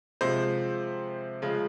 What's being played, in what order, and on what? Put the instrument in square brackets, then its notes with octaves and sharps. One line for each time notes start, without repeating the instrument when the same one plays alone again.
[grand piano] C3 F3 G#3 C5
C#3 F3 G#3